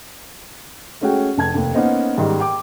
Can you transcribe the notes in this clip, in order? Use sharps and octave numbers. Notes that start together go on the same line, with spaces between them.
G#3 A3 C#4 F#4 G#4 G5
F1 A5 G#6
F1 D#2
A#3 B3 C#4 D#4 C5
G#2 D#3 G3
G5 D6